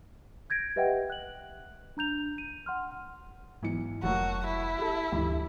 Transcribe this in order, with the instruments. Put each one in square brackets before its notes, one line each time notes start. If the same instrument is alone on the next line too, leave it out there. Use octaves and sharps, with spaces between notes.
[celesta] G6 G#6 A#6 D7
G4 B4 D#5 E5 F#5 G5
F#6 F#7
D4 A#5 G6 F7
D#7
F#5 C6 F6
[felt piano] B1 E3 C#7 [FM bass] G#2
[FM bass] F1 [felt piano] F#3 A3 A#3 [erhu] F#4
[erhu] E4
[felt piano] G4 A4
[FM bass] D2 [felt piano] G2 E3